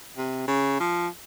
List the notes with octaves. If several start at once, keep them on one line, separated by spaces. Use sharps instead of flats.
C3
C#3
F3